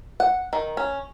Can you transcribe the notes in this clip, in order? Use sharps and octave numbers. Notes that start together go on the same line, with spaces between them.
F#5
D#3
C#4